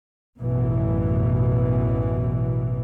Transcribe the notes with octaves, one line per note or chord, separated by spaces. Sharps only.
A1 F#2 B2 E3